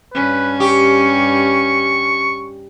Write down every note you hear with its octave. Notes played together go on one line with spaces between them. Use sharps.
G2 C#4 B4
G4 C#6